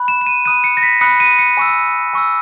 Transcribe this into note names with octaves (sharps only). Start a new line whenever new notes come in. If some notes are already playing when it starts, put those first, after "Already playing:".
Already playing: B5 F#6
E7
E7
D#7
B5 D#6 F#6 D#7
C#7
A#6
B6
B5 D#6 F#6 C#7
D#7
C#7
G#5 C#6 E6
G#5 C#6 E6